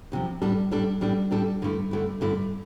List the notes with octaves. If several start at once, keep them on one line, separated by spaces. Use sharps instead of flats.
D2 C3 F3
A2 G3 D4 A4
A2 G3 D4 A4
A2 G3 D4 A4
A2 G3 D4 A4
G2 D3 A3 E4
G2 D3 A3 E4
G2 D3 A3 E4